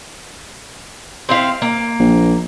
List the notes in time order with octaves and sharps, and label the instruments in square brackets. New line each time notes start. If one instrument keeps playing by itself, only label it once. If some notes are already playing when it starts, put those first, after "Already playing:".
[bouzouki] C4 E4 F5
A#3
[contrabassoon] A#1